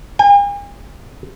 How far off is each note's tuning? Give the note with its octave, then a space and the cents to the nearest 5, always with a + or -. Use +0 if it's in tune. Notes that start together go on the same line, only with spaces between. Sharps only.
G#5 -45